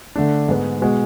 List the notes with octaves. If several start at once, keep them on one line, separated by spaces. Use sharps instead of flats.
D3 A3 D4
G#2 G#3 B3
B2 G#3 B3 F#4